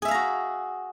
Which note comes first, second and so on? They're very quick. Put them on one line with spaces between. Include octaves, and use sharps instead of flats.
G#4 E5 F5 A#5 F#4